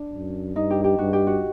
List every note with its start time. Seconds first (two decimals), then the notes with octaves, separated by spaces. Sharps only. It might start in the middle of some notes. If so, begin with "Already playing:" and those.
Already playing: D4
0.14 F#2
0.56 G2 D#4
0.70 G4
0.84 G4
0.98 G2 F#4
1.13 G4
1.27 F#4